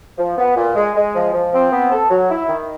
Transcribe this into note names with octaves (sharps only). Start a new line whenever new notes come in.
F3
B3
A#2
G#3
G#3
F3
F3
C4
B3
A4
F#3
E4
D#3